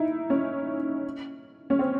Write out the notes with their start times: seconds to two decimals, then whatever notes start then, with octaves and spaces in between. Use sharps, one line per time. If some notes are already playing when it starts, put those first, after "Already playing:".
Already playing: D#4 E4
0.30 C#4
1.70 C#4
1.79 C4